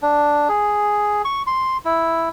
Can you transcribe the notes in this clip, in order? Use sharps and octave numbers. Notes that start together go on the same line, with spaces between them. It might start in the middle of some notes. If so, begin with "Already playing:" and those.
D4
G#4
C#6
C6
E4